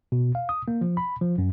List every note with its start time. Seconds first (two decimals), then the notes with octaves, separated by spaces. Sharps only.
0.12 B2
0.35 F5
0.49 D#6
0.68 A#3
0.81 F3
0.97 B5
1.21 F3
1.38 F#2